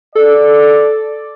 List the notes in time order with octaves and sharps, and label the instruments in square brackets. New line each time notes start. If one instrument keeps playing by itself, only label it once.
[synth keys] A4 [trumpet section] D5